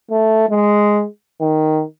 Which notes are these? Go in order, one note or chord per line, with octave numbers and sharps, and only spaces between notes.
A3
G#3
D#3